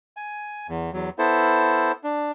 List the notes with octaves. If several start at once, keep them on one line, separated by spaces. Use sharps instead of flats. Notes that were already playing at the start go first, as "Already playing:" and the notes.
G#5
E2
E2 F#3
B3 E4 A4 C5
D4